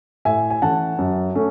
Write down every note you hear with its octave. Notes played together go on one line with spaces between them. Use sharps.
A2 E5 G#5
G#5
E3 A3 C#4 F#5 A5
F#2
A3 C#4